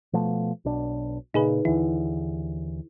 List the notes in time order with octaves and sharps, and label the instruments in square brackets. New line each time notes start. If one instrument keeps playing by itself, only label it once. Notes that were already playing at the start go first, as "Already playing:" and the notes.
[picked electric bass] B2 F3 A3
B1 B2 D4
[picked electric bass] A#2 C#3 [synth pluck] D#4 G#4 B4
[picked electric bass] D#2 D3 E3 [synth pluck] E4